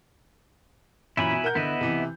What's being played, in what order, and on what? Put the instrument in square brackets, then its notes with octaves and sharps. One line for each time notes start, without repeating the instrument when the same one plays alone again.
[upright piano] F#2 A#2 E3 [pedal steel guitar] E4 G#5 B5
[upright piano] B2
A#4 F#5 G6
[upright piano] D3 [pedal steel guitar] B3 E4 D#5
[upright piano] C3 E3